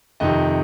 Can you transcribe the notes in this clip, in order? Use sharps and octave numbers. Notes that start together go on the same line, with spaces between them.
F2 C3 D#3 D#5